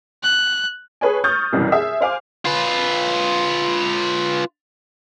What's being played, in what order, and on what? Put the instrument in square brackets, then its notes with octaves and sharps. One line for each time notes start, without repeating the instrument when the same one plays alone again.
[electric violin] F#6
[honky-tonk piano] G#4 A4 B4 C#5 G#5
C#6 D#6 F6 G6 A6
C2 F#2 B2 E3 G3
G#4 E5
C5 F5 G#5 D6
[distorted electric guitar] F4 B4